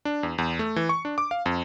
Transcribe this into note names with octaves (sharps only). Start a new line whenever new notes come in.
D4
E2
E2
A3
E3
C#6
D4
D6
F5
F2